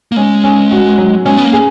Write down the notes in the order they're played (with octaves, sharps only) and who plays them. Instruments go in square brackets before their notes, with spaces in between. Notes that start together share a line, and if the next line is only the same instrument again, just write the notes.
[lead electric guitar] A#3
[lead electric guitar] G#3 [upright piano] C#4
[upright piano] C#4
F#4
F#3
[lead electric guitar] G#3 [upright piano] C#4
[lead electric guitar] B3
A#3
[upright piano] G#4